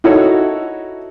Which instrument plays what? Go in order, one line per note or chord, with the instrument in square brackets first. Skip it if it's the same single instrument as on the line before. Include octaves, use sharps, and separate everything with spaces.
[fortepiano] D#4 E4 F#4 A4 C#5